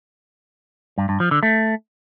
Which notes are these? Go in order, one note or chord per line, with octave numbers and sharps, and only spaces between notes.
G2
G2
F3
D3
A3